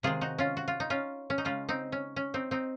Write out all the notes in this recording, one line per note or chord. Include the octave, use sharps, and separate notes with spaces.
C3 D#3 G#3 F4 G#4
D#4 F#4
C#4 F4
F#4
F4
D#4
C#4 F4
C#4
D#4
C#3 G#3 C#4 F4
C4 D#4
C#4
C#4
C4 D#4
C4 D#4